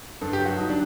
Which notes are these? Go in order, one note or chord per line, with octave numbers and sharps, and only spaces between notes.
G2 A4
G4
F#3
F#4
F#3 D#4
D4